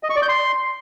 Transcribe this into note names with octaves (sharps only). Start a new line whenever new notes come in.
D#5
C#6
D5
G6
C6